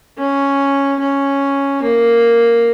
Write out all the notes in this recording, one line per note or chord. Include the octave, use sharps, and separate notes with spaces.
C#4
C#4
A#3